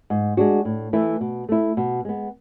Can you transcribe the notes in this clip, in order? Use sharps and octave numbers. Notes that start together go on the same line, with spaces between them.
G#2
G#3 D4 F#4
A2
E3 A3 E4
B2
A3 E4
B2
G#3 B3